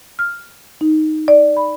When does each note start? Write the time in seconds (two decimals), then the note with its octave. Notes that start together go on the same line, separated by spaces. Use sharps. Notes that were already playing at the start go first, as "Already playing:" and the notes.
0.19 F6
0.81 D#4
1.28 D5
1.57 B5